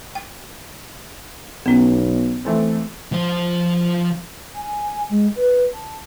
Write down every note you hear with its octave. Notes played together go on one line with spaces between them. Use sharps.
G5
B1 B3 C#4
E3 A3 C4
F3 C5
G#5
G#3
B4
A5